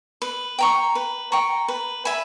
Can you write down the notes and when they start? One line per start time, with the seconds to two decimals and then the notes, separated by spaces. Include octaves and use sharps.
0.22 B4
0.59 G5 A#5 C#6
0.95 B4
1.32 G5 A#5 C#6
1.68 B4
2.05 E5 G#5 B5